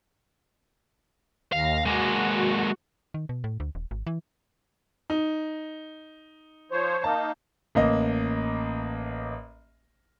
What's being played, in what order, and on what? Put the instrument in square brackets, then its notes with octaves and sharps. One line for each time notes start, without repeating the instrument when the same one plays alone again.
[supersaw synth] D#2 A#6 [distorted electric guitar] F5
[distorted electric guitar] G#3 A#3 [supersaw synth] F#4
[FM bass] D#3
B2
A2
D2
D#1
G#1
E3
[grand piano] D#4
[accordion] F3 C5 C#5
[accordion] A#3 D#4 [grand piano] A5
[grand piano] A1 A#3 D#5